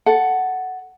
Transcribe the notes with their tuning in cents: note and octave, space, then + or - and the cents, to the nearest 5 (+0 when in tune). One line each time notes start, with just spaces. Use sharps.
A4 +0 F#5 +5